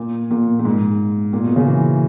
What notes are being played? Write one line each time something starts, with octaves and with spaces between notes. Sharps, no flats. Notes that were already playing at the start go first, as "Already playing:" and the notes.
Already playing: A#2
A#2
A#2
G#2
A#2
B2
C#3
E3